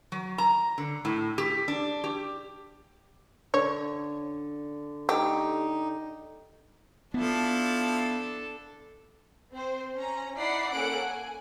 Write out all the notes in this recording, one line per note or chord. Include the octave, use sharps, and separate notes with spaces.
F#3
A#5
D3
A2
G4
D4
G4
D3 C#5
A3 D#4 G4
F3 B3 D4 E4 F4 A4
C4 C5
C#4 A#5
D#4 E4 D5 F#5 B5 C7
A#3 C#4 A4 F#5 F#6 D7
G#5